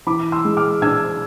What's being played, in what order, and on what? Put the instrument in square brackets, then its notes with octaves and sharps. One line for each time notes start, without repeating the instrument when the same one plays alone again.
[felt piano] E3 B5 D6
C6 E6
G#3
D6 F6
D4 E6 G#6